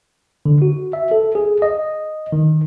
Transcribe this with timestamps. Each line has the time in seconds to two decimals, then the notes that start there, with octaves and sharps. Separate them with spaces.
0.46 D3
0.62 F#4
0.93 E5
1.11 A4
1.35 G#4
1.62 D#5
2.32 D#3